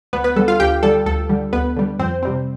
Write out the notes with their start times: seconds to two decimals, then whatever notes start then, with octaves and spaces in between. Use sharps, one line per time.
0.13 D2 B3 B4
0.24 B3 B4
0.36 D3 G3 A4
0.48 F4 F5
0.60 D2 G4 G5
0.83 D3 G3 A4
1.06 D2 A4
1.29 D3 G3
1.53 D2 B3 B4
1.76 D3 G3
1.99 F2 C4 C5
2.23 C3 G3 C4